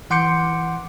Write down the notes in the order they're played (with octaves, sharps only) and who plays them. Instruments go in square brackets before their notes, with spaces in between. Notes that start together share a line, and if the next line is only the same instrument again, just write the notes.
[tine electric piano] E3 F#5 C6 D6 G6 C#7